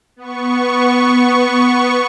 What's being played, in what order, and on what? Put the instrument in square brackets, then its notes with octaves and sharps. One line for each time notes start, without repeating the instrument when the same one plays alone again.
[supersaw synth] B3 C#6